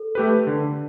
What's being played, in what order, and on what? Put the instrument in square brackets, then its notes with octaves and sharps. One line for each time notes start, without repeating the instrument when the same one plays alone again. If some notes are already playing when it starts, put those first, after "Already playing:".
Already playing: [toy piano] A4
[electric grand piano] A3 G4 B4
D3